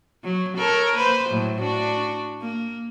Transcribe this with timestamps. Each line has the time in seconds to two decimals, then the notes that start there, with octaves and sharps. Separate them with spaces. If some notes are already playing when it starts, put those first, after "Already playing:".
0.24 F#3
0.57 A4 A#4 C#5
0.96 A#3 B4 C5
1.27 A2 F#3
1.59 D4 F#4
2.42 A#3